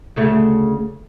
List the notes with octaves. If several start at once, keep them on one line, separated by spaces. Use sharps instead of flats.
D2 C#3 A3